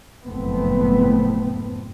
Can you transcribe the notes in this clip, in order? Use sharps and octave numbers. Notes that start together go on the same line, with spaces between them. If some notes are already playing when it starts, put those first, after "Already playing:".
F#1 F2 A2 A3 B3 C4